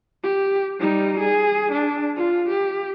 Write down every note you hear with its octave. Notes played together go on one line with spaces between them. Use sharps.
G4
G3 D#4
G#4
D4
F4
G4